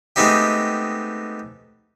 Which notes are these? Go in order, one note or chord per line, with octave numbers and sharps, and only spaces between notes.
G#3 A3 B3 C4 D#4 G4